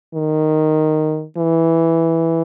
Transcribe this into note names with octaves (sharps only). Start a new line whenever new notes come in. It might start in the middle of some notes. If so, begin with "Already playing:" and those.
D#3
E3